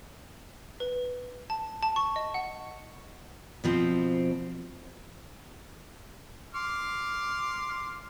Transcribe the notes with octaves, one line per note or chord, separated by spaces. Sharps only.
B4
A5
A5
C#6
D#5
F#5
B2 F3 C4
C6 D6 F6